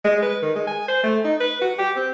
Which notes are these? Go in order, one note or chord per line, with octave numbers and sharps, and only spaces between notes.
G#3
B4
D#3
G#3
G#5
C5
A3
D#4
B4
F#4
G4
C4